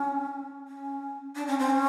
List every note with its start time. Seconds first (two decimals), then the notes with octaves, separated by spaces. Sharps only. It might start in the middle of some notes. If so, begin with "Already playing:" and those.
Already playing: C#4
0.68 C#4
1.35 D4
1.47 C#4
1.59 C4
1.70 C#4